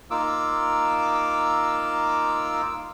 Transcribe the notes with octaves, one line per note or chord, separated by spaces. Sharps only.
A#3 D#4 F4 D6 E6